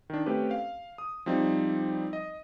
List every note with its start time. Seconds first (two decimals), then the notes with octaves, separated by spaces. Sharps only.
0.10 D#3 D4
0.26 A3 C4 C#4 G4 B4
0.51 F5
0.98 D#6
1.26 F3 G3 C4 D#4 D5
2.13 D#5